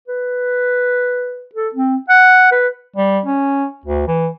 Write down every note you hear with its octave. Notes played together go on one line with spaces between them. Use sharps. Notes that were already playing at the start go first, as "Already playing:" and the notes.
B4
A4
C4
F#5
B4
G3
C#4
D2
E3